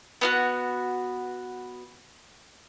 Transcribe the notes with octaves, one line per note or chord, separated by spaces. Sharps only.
B3 F4 F#4